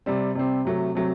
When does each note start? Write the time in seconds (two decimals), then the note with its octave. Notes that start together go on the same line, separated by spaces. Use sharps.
0.06 C3 G3 C4
0.35 C3 G3 C4
0.65 C3 F#3 A3
0.95 C3 F#3 A3